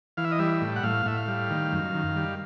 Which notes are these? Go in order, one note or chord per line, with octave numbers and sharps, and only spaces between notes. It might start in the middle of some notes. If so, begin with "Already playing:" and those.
E3 F5
E5
D#5
G3 E5
A2
F#5
A2 F5
A2 E5
F5
G3
D#3
F#2
D#3
G3